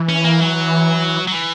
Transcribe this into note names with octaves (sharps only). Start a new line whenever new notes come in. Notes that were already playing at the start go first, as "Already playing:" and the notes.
Already playing: E3
C#4
A#3
F#3
F#3
E3